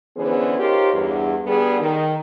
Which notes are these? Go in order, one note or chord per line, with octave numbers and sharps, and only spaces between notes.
D3 E3 B3 C#4 G#4 C5
D#4 F4 G4 A#4 C5 C#5
E2 G2
D3 G3 B3 G#4
D#3